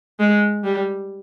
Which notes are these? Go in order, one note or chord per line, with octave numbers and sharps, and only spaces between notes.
G#3
G3